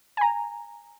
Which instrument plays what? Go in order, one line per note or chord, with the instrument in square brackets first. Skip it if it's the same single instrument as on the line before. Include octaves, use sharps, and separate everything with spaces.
[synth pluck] G#5 A#5